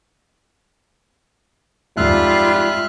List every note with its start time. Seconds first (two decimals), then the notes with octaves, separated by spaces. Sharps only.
1.97 F2 G#2 G3 F4 E5 F6 F#6